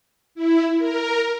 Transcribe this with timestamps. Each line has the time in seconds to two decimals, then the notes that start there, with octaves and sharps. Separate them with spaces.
0.35 E4
0.78 A#4